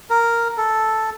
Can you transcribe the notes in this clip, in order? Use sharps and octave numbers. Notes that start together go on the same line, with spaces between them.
A#4
A4